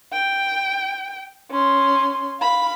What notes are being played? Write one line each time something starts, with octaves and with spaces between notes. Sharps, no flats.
G5
C#4 C6
F5 B5